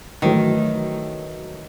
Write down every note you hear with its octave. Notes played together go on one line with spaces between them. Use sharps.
D#3 E3 F#3 A3